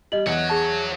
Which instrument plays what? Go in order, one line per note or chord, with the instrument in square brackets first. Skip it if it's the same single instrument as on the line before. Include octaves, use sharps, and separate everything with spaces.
[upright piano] G3 [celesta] D#5 F#7
[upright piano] E2 [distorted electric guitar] C#5 F#5
[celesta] G#4 A5